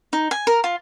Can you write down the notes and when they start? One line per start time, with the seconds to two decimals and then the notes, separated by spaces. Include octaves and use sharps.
0.13 D#4
0.31 G#5
0.47 A#4
0.64 F4